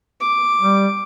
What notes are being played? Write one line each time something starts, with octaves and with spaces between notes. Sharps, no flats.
D6
G3